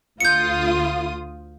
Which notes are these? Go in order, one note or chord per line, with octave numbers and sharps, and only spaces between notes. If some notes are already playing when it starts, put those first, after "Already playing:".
D2 F4 D#6 G6 C#7